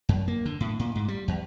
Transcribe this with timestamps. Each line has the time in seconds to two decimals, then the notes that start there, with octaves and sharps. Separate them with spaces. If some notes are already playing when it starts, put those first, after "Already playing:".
0.09 F#2
0.28 A#3
0.46 D3
0.61 A2
0.80 A#2
0.96 G#2
1.08 G3
1.28 E2